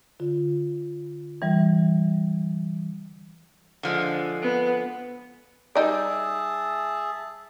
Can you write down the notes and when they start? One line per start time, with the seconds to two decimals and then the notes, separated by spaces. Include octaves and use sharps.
0.20 D3 F4
1.42 E3 G3
3.83 D3 F3 G#3
4.42 B3
5.75 G3 D#4 G#4 D5 E5 A5